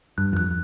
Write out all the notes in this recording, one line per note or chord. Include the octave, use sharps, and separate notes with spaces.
G2 F#6
F2 F#6